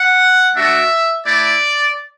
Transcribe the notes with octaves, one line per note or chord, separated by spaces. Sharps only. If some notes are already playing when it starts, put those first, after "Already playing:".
Already playing: F#5
A3 D4 F#4 E5
A3 E4 D5